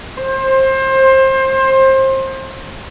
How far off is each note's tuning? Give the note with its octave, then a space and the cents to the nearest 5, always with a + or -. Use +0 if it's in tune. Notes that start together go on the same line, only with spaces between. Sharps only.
C5 +25